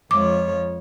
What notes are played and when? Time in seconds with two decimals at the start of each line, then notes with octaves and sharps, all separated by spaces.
0.11 F2 F3 G#3 C#5 D6